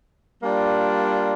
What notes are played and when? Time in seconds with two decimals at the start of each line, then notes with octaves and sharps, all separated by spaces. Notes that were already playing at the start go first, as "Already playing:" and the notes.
0.41 G3 A#3 D4 F4